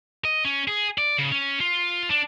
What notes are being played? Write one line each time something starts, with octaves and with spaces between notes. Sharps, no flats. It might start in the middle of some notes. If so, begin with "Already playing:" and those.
D#5
C#4
G#4
D5
C#3
C#4
F4
D4